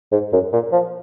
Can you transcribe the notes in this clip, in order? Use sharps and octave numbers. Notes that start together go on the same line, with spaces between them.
G#2
F#2
A#2
F3